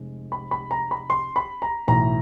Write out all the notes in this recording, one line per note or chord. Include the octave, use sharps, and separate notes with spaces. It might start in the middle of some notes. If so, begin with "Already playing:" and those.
Already playing: F1 G#3
B5
B5
A#5
B5
C6
B5
A#5
B1 A2 E3 A#5